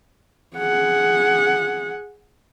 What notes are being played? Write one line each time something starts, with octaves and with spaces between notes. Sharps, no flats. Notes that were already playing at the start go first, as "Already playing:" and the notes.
G#4 F#5